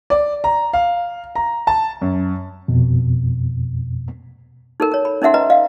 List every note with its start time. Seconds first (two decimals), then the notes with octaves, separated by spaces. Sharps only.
0.10 D5
0.44 A#5
0.73 F5
1.36 A#5
1.67 A5
2.02 F#2
2.68 F2 B2
4.80 D#4 A4 A#4
4.92 A#4 C#5
5.05 B5
5.22 C#4 D#4 A#4 E5 F#5 C6
5.34 B4 D#5 A#5
5.50 D#5 F5